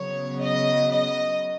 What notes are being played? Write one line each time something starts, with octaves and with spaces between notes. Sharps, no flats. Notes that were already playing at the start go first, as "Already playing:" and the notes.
Already playing: C#3 F#3 B3 C#5
D#5
D#5